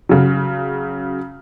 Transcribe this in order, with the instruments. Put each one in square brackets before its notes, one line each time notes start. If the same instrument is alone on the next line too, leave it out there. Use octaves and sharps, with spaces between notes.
[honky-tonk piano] C#3 F#3